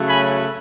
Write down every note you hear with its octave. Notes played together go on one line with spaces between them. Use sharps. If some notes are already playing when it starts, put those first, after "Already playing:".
Already playing: C#3 F#3 A3
G#5 B5